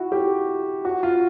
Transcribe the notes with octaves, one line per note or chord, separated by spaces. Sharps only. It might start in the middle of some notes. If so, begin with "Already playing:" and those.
Already playing: E4 F#4
G4
F#4
F4